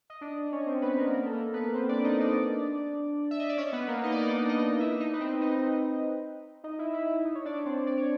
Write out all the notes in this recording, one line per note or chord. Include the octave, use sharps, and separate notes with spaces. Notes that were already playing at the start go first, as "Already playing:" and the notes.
D#5
D4 D5
C#4 C#5
C4 C5
B3 B4
A#3 A#4
A#3 A#4
A4
A#3 A#4
B3 B4
C4 C5
D4 D5
D#4 D#5
D4 D5
E5
D#5
D5
C#4 C#5
B3 B4
A#3 A#4
D#4 D#5
D5
D#4 D#5
D4 D5
D#4 D#5
D#4 D#5
E4 E5
D#4 D#5
B4
C4 C5
D#4 D#5
D#4 D#5
E4 E5
E4 E5
D#4 D#5
C#5
D4 D5
C4 C5
D5
C#5